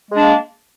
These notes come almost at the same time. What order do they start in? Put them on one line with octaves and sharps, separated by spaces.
G#3 D4 A#3